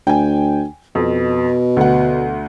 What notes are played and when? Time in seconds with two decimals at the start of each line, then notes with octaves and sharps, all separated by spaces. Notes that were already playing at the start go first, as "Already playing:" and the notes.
0.07 D2 G5 G#5
0.95 F2 B2
1.77 D2 F#5